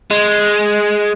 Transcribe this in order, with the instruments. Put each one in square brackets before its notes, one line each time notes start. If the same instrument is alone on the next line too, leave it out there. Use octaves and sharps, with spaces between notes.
[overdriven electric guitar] G#3